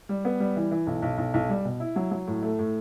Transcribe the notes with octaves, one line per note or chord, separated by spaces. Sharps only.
G3
B3
G3
E3
E3
B1
B1
B1
B1
G3
B2
E4
F#3
F#3
A2
A3
A2